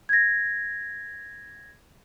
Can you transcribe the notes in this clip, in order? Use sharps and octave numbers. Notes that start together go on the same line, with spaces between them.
G#6 A#6